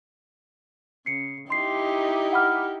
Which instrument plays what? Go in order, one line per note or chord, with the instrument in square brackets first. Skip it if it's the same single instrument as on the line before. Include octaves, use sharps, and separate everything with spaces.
[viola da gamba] C#3 [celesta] C7 C#7
[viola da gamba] D#4 E4 G4 [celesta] C6 C7
[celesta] F#5 B5 F6